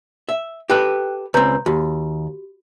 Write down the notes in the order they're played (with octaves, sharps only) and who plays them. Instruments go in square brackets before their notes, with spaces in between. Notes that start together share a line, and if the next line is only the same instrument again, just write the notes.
[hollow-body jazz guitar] E5
[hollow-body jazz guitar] G4 A4 B4 [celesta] G5 F#6
[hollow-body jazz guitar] C#2 C4 [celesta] B4 A#5 G6
[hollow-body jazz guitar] D#2 [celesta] F#4 G4